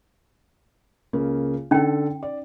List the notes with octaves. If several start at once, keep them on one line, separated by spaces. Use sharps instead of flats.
C#2 C#3 A#3
D3 C#4 D#4 A4 G5
D5